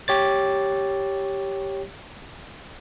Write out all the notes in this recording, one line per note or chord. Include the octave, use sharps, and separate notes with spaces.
G4 C#5 A6